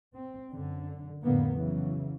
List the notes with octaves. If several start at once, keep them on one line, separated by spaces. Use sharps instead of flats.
C4
F#2 D3
F2 A2 D3 A#3 B3
C#3 E3 F#3